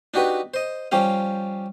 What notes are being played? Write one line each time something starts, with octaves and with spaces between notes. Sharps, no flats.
D4 D#4 F#4 G4 B4
C5 D#5
F3 G3 C#4 G4 F5